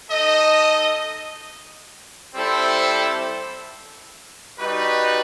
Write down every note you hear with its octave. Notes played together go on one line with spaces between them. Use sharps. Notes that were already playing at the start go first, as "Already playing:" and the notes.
D#4 A4 D#5
G3 C4 E4 A4 C5
G3 D#4 F#4 B4